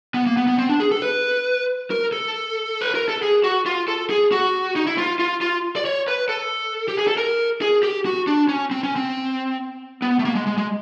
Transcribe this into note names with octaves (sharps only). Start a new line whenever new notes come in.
B3
A#3
B3
B3
C4
D4
G#4
A4
B4
A#4
A4
B4
A#4
A4
G#4
F#4
F4
A4
G#4
F#4
D#4
E4
F4
F4
F4
D5
C#5
B4
A4
G4
G#4
A4
A#4
G#4
G4
F#4
D4
C#4
C4
C#4
C4
B3
A3
A#3
G#3
G#3
G#3